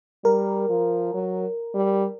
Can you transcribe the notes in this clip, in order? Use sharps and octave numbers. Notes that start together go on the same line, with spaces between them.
G3 A#4
F3
F#3
G3